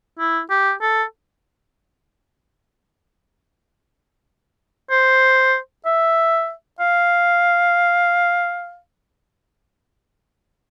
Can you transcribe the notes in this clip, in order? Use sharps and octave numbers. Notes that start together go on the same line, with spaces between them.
E4
G4
A4
C5
E5
F5